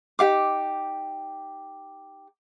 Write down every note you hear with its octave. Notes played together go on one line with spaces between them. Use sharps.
D#4 G4 F5 D6